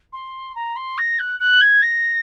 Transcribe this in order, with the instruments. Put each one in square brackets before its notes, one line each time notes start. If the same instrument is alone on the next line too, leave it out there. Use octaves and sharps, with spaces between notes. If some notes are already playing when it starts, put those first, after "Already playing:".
[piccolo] C6
A#5
C6
A#6
F#6
F#6
G#6
A#6